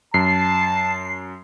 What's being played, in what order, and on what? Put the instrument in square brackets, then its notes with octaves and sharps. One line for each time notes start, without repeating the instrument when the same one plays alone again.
[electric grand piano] F#2 [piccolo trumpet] A5 [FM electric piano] C7